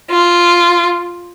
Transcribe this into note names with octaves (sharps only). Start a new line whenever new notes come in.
F4